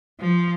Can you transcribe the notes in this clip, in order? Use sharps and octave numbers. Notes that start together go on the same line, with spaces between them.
F3